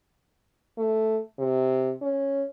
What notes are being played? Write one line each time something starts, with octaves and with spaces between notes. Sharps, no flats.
A3
C3
C#4